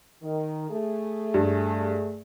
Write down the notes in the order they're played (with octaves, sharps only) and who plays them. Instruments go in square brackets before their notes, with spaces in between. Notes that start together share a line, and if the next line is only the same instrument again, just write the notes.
[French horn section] D#3
A3 G#4
[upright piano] G2